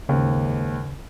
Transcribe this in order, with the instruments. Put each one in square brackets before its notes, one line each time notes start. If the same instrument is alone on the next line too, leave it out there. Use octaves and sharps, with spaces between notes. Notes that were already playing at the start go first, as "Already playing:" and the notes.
[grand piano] D#2 G#2 [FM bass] C#3